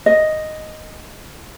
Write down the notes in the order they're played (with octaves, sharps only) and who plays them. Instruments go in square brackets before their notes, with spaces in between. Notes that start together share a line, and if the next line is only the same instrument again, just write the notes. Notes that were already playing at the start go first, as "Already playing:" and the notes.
[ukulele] D#5